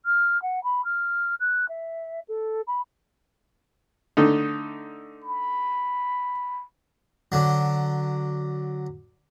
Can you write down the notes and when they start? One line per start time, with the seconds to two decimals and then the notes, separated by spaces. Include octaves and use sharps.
0.06 F6
0.42 F#5
0.64 B5
0.85 F6
1.40 F#6
1.69 E5
2.28 A4
2.67 B5
4.17 D3 A3 D#4
5.23 B5
7.32 D3 F#3